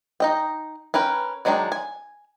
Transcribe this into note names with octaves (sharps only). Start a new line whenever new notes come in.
D#4 D#5 G5
C#4 A#4 B4 G5
D#3 F#3 G#3 D4 G5
G#5